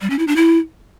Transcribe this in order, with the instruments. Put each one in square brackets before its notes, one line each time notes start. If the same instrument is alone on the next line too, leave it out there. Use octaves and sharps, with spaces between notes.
[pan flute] G3
C#4
E4
D4
E4